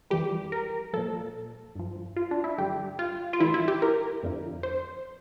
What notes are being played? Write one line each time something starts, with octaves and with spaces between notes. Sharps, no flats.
F2 E3 G3 G4
A#4
A#2 F3 A4
G2 F3
F4
D4
E4
G2 D3 G3 G4
F4
F4
A2 E3 G3 E4
E4
G4
A#4
F2 D3 F3
C5